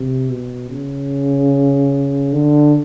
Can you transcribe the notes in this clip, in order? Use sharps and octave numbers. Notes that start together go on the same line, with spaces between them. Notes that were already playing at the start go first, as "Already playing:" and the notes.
Already playing: C3
B2
C#3
D3